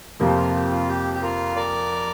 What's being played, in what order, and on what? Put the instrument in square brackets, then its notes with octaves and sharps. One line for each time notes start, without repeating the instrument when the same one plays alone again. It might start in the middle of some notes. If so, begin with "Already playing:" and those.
[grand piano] F2 C3 F3 A#3
[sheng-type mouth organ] G4
F4 A#4
G4
F4
G4
G4
F4 A#4
A#4 D5